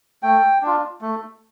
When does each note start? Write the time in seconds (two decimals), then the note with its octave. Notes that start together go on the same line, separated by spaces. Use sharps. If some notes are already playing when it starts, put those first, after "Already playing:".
0.23 A3 G5
0.62 D4 F4
1.02 A3